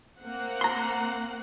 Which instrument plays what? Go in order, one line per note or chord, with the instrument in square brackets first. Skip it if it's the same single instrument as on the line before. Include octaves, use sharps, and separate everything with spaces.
[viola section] A#3 C4 F#5
[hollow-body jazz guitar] A#5 C6